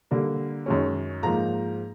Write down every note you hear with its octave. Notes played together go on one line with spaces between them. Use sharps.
D3 G3 A#3
F#2 D#3 G#3 C#4
G#2 F3 A#3 A#5